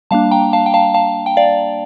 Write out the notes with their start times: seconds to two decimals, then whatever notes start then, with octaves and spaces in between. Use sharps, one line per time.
0.11 G3 A#3 D4 F5 A5
0.31 G5 A#5
0.53 F5 A5
0.66 G5
0.74 F5 A5
0.94 F5 A5
1.26 G5
1.37 D5 F5